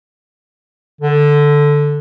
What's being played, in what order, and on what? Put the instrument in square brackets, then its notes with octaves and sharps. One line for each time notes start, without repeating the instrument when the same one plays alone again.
[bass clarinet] D3